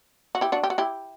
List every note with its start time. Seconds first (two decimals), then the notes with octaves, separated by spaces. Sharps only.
0.35 F#4
0.41 E4 G4
0.52 D4 F#4
0.63 G4
0.70 F#4
0.78 E4 G4